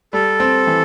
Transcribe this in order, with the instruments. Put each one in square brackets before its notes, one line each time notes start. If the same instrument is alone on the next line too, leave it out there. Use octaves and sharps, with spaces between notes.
[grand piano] G3 [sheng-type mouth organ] A4
[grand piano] C4
E3